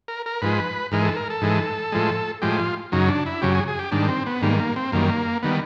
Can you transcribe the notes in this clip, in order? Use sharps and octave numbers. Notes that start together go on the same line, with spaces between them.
A#4
A#4
G#2 F3 G#3 B4
G#2 E3 G#3 A#4
A4
A#4
A4
G#2 E3 G#3
A2 F3 G#3
A2 F3 G#3 G4
F4
F#2 C#3 F#3 D#4
D4
E4
F#2 C#3 F#3 G4
G#4
G#4
G4
G#2 D#3 G3 D4
C4
B3
G#2 D#3 G3 A#3
A#3
C4
F#2 D#3 G3 A#3
D#3 G3 B3